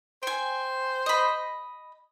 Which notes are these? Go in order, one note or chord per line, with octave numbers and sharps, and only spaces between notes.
C5 G5 G#5
D#5 B5